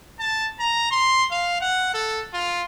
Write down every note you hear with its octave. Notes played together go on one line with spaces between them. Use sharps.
A5
A#5
C6
F5
F#5
A4
F4